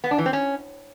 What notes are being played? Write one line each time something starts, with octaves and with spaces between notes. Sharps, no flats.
B3
D4
E3
C4
C#4